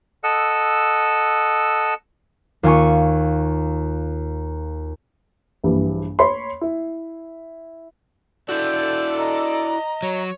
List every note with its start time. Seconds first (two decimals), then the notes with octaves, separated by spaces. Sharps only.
0.24 A4 D#5 F#5 E6
2.63 D#2 F4 G#5 C#6
5.63 A#1 G2 E3
6.19 C#5 B5 C6
6.61 E4
8.49 E4 F#4 A4 D5 G6
9.18 D#5 A#5
10.03 F#3 C#5